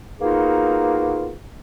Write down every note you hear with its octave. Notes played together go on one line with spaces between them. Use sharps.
A#3 B3 D#4 F4 F#4 G#4